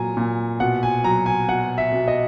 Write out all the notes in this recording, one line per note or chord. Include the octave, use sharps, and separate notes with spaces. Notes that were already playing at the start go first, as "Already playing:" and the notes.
Already playing: A#2 F#3 G#5 A#5
A#2
B2 F#5
G#5
F#3 A#5
G#5
B2 F#5
E5
B2
D#5